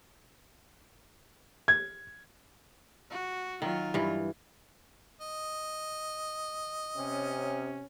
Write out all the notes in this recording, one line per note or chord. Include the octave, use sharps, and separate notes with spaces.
G#6
F#4
D#3 F#3 F4
G2 E3
D#5
C3 C#4